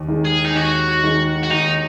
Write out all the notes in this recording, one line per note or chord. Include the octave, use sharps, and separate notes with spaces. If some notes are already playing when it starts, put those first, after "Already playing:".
Already playing: D#2
D#3 G#3
G#4
D#4
D#2 F#4
D#3 G#3
F#4
D#2 D#4